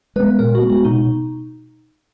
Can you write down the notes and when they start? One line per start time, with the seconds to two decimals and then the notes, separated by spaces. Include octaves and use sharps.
0.16 G#3 B3 B4
0.39 A#2 A#4
0.55 F#4
0.61 G#3 B3
0.70 F#4
0.85 B2 D#4